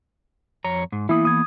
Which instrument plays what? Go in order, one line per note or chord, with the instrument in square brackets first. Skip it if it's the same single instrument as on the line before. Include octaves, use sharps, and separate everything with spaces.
[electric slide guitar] F2 C#5 A#5
G#2
[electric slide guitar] E3 A#3 B3 [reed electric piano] E4 D#6
[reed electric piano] D#6 G#6